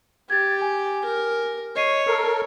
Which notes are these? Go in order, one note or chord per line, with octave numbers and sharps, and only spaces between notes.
G4 G#6 A6
G#5
A#4
C#5 D#5 C7 D#7
A4 A#4 C7